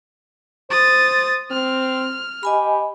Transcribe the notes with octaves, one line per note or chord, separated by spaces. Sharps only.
C5 D#6 A6
C4 F6
G4 D#5 G#5 B5